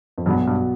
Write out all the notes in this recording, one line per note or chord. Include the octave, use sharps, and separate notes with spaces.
F2
B1 G2 B2 B3
G2